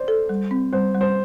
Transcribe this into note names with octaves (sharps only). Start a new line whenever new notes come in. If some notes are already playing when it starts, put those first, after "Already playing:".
Already playing: C5 D5
A4
G3
C4
G3 C5
G3
C5